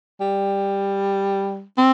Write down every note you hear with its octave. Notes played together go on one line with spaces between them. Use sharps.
G3
C4